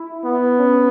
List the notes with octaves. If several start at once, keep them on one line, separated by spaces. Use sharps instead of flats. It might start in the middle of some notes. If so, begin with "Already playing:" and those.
Already playing: E4
B3
C#4